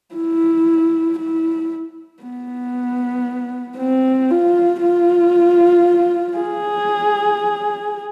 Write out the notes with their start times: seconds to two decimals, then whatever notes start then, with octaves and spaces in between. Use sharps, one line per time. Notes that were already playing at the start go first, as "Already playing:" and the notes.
0.15 E4
1.18 E4
2.22 B3
3.77 C4
4.30 F4
4.82 F4
6.38 G#4